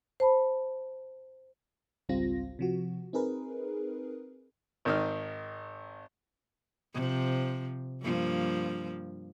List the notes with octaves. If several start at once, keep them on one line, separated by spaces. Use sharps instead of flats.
C5 A5 B5
G#1 C#2 G3 C4 F4 A#6
C3 F3 F#4
C4 D#4 G#4 A#4 B4
G#1 D#3 D#4 F6
C3 F3
G2 F3 A#3